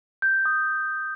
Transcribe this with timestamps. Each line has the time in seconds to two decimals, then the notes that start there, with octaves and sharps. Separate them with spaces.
0.22 G6
0.46 D#6